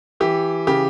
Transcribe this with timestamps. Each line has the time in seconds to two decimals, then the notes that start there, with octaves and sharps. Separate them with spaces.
0.20 E3 G4
0.67 C#3 G4